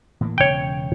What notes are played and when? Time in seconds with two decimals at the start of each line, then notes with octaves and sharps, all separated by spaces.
0.21 A2 E3 A#3
0.38 E1 C#3 C#5 G5